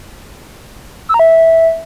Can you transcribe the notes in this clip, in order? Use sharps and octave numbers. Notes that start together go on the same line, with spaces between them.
E6
A#5
E5